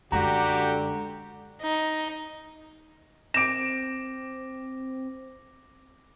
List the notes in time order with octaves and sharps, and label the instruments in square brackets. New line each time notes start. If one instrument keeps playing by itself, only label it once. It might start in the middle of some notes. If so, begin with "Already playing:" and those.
[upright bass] F#2 G#3 [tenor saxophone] D3 [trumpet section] F#4 G4 [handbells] A#5
[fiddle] D#4
[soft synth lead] C4 [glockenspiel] D6 A#6 [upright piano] D7 E7